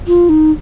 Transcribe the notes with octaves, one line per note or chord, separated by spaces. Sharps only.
F4
D#4